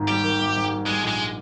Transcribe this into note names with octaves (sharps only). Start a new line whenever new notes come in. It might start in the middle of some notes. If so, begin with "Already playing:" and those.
Already playing: G#1 G#2 D#3
G3 G4
D#3
G#1
G#2
G3
G3 G#3
A#1 G#3